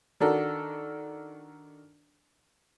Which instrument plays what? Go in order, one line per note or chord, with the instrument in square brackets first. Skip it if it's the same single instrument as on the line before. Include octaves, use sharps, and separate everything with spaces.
[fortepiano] D#3 D4 F#4 A4 A#4